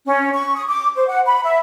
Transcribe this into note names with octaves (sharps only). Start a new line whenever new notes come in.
C#4
C#6
D#6
D6
C5
F#5
B5
E5